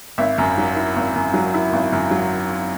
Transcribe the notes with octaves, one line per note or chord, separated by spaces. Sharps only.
G#1 E5
F#2
F#3
E4
G#1
F#2
F#3
E4
G#1
F#2
F#3